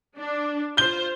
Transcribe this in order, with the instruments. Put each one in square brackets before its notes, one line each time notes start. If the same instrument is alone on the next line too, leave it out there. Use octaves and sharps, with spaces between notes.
[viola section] D4
[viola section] F4 C5 [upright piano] G6 G7